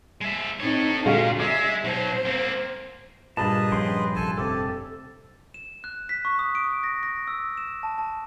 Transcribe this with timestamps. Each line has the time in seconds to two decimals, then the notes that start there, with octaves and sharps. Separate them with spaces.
0.21 G#3 E5
0.60 C4 D#4 A4 C#5
1.06 A#2 D3 G#3 F#4 F5
1.40 G#3 D5 E5
1.84 B2 F#3 C5
2.25 A#3 C4
3.37 G2 A#2 G#4 B4 D#5 A5
3.72 A#1 F3 C#4 G5 C6
4.15 A#1 C3 F3 A4 G#5 A5
4.38 F1 C3 C4 G4 A4
5.54 E7
5.84 F#6
6.09 B6
6.25 C#6
6.39 D#6
6.55 D7
6.83 A#6
7.03 A#6
7.27 E6
7.57 E7
7.83 A5
7.98 A5